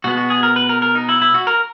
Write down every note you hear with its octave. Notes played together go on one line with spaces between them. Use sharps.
B2 G#3 B3 F#4
F#4
G#4
A#4
B4
A#4
A#4
D#4
E4
E4
F#4
A#4